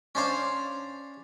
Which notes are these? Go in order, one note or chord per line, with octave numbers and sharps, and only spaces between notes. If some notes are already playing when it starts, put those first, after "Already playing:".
C#4 D4 C5 F5